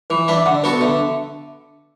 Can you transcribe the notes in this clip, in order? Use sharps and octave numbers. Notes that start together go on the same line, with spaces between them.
E3 B4
D4 B4 E5
E5
D3 F#5
D5
B3 F#4 A4 B4
B4
D3 E5